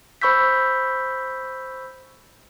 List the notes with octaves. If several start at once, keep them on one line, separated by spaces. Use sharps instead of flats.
C5 B5 C#6 E6 G6 B6